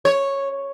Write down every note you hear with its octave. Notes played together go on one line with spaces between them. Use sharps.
C#5